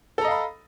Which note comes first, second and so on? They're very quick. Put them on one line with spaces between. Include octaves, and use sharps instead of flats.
A4 A#5 D#5 F5 B5